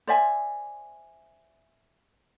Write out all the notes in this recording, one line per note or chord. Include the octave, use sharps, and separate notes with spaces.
C5 D5 E5 G#5